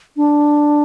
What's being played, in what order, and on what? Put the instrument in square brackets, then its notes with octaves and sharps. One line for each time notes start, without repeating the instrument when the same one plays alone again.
[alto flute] D4